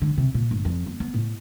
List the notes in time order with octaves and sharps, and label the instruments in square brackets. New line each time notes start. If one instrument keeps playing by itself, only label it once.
[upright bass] D3
C3
A#2
G1
F2
B3
B3
A2